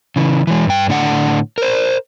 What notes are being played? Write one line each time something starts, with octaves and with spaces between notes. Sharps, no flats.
C#3 E3
E3 G#3
G2 G5
A2 D3 F#5
A#4 C5